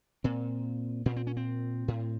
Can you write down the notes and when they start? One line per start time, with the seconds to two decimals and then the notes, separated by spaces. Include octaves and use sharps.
0.24 A#2 C4
1.06 A#2 C4
1.16 C4
1.27 C#4
1.37 C4
1.88 A2